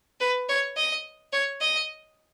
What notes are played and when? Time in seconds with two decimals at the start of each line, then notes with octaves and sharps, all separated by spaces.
0.20 B4
0.49 C#5
0.77 D#5
1.33 C#5
1.61 D#5